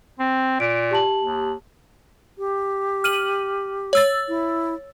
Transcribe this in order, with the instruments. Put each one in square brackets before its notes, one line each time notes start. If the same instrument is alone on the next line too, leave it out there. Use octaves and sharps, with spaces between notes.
[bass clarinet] C4
[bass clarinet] A#2 [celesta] D7
[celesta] G4 A5 F#7
[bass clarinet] D#2
[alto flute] G4
[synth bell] F6 D#7 F#7
C#5 E6 A6
[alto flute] E4